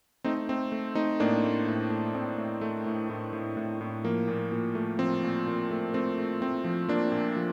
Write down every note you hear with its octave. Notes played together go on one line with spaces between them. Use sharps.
A3 C4 D#4
A3 C4
A3
A3 C4 D#4
A2 A#3 D4
A3
A2
A3
A2 C4
A2
A3
A2
A2
A2
A2
A2
F3 A#3
A#2
A#2
A3
F3 C4
A#2
A#2
A3
A3 C4
A3
A3 C4
F3
F3 A#3 D4
A#2
F3